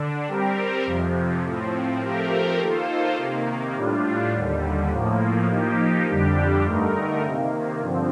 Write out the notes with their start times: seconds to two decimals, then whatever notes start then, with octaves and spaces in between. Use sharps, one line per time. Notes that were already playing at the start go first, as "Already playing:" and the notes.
Already playing: D3 D4
0.27 G3 C4 G4 A#4
0.86 F2 C3 F3
1.43 A2 F3 C4
2.01 F3 A3 C4 G4 A#4
2.59 D#3 A#3 F4 A4 C5
3.17 C3 D#3 A#3
3.76 A2 G3 D4 F4
4.33 D#2 D3 G3
4.91 A2 F3 A#3
5.49 F3 A#3 D#4 G4
6.07 F2 D3 G3 D4 G4
6.65 G2 D3 A3 D#4 A#4
7.23 C3 D#3 A#3
7.81 G2 D3 F3 C4